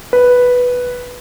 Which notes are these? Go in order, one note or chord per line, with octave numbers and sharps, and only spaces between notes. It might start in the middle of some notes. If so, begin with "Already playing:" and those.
B4